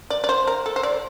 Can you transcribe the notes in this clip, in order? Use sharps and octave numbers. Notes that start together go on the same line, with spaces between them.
D5
D5
C5
A#4
A4
C5
D5